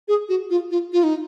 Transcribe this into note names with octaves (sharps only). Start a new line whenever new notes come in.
G#4
F#4
F4
F4
F4
D#4